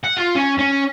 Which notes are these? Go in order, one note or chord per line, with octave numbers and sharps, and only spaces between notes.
F#5
F4
C#4
C#4